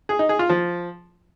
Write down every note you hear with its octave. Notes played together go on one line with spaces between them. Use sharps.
G#4
D#4
G#4
F4
F3